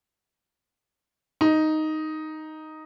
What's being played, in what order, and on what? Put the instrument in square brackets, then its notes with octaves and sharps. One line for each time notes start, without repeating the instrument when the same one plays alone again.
[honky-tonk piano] D#4